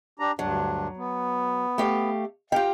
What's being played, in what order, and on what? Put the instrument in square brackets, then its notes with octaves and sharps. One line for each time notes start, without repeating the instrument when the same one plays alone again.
[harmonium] D4 G4 A#5
[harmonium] D2 G2 D4 [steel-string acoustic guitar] F#3
[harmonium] B3
[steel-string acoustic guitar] A3 G4 F5
[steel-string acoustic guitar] F4 G4 [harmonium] F5 G5